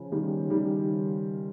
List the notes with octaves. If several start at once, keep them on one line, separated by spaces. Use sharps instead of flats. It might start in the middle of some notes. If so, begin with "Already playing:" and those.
Already playing: C#3 F3
D#3 G3
D#3 G3